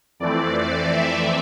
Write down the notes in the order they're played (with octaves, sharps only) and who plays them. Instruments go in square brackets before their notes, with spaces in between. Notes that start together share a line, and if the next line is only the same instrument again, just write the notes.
[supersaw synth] F2 E3 A3 C4 D5
E5